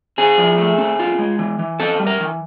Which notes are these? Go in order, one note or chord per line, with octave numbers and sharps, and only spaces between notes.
C4 G#4
F3
A3
C4
F4
G#3
E3
E3
C4 A4
G3
A#4
E3